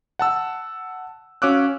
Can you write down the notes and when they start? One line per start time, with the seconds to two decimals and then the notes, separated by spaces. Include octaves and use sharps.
0.19 F#5 A5 E6
1.42 C#4 F#4 F5 D6 E6 F#6